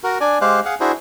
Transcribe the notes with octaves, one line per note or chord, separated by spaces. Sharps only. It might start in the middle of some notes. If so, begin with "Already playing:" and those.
F#4 A#4
D4 D5 G#5
G#3 G4 C5 F5 F#6
G#4 F5 F#5
D4 E4 F#4 G#4 C5